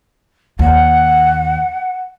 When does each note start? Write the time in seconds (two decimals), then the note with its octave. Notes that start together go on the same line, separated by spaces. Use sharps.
0.59 D#2 F#5